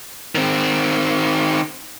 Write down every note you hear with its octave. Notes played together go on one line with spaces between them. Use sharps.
D#3 C4